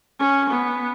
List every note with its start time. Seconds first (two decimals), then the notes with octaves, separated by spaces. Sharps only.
0.19 C#4
0.50 B3